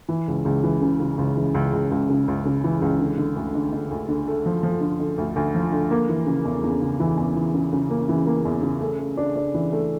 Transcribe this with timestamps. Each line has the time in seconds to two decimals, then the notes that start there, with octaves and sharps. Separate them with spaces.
0.09 E3
0.28 C#2
0.45 C#2
0.63 E3
0.81 C#3
1.00 C#3
1.18 C#2
1.37 E3
1.54 C#2
1.73 C#2
1.91 C#2
2.10 C#3
2.28 C#2
2.45 C#3
2.64 E3
2.82 C#2
2.99 D3
3.18 D3
3.36 D2
3.55 D3
3.72 D3
3.91 D2
4.08 D3
4.27 A3
4.46 F3
4.63 F3
4.81 D3
5.00 D3
5.18 D2
5.36 D2
5.55 F3
5.72 D3
5.91 A#3
6.09 E3
6.27 C#3
6.45 E2
6.63 E2
6.81 C#3
7.00 E3
7.17 E2
7.36 E3
7.54 C#3
7.73 C#3
7.90 A#3
8.09 E3
8.27 A#3
8.45 E2
8.62 C#3
8.81 A3
8.99 A3
9.17 D4
9.36 D4
9.54 E3
9.72 A3